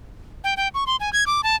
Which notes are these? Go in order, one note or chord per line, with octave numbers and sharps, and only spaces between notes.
G5
G5
C#6
C6
G#5
G#6
D6
A5